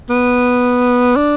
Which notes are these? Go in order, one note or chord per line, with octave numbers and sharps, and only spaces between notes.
B3
D4